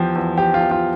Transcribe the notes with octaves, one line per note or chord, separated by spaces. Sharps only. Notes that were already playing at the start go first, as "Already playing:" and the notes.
Already playing: E2 F3 G4
E2
F3 G4
F4
E2
F4